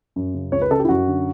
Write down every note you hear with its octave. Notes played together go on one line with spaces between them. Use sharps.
F#2
C#3
C#2 C#5
B4
C#3 A4
G4
E4
F#2 F#4
D3